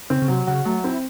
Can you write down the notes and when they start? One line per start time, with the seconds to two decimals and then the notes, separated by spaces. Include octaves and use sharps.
0.10 C#3 C4
0.22 C#3
0.28 C3 F#3
0.47 C#3 F#4
0.65 F#3 A3
0.84 C4 E4